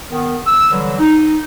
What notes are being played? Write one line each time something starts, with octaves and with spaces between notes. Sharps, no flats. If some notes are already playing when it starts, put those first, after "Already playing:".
D#3 B3
E6
D3 E3 F#3 G3
D#4